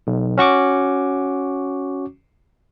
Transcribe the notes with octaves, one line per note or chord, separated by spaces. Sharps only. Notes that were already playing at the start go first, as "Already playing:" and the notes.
B1
C#4 F#4 C#6 D6